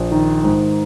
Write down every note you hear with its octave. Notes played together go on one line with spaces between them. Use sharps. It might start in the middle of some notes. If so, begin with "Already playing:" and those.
Already playing: A#1
D#3
G#2